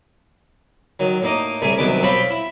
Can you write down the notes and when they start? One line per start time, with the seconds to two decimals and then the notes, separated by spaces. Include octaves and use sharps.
1.00 D#3 F#3
1.22 A2 A#3 D#4 D#5
1.62 C2 A2 A3 G#4 A#4 G#5
1.77 C2 C3 D#3 F#3 B3 D6
2.03 B1 C4 F4 G4 C#5 B5
2.30 E4